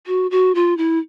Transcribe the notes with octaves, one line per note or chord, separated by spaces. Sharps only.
F#4
F#4
F4
E4